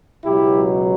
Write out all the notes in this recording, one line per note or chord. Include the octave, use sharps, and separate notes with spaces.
C#2 B2 F#3 E4 G4